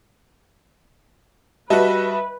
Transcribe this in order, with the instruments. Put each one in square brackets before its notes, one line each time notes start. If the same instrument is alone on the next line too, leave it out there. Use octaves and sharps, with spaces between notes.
[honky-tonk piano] G3 F#4 [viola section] B4 [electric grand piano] D#5 E5 A5